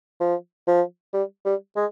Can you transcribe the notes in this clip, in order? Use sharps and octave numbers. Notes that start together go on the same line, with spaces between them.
F3
F3
G3
G3
G#3